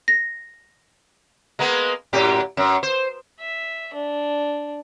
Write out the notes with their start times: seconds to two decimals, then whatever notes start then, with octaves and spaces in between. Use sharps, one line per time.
0.08 A#6
1.59 G#3 A#3 B3
2.13 F#2 A2 G4
2.57 F#2
2.83 C5
3.40 E5
3.94 D4